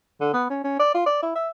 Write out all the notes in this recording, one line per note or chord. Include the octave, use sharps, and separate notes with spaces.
D3
B3
C#4
C#4
D5
F4
D5
E4
E5